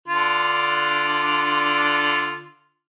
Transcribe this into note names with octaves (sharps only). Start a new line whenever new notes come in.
D3 D4 F4